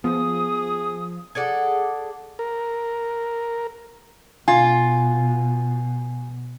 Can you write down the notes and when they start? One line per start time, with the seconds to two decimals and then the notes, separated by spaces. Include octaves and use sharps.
0.04 F3 B3 G#4 D#6
1.35 G#4 A4 D5 F#5
2.39 A#4
4.48 B2 F4 G#5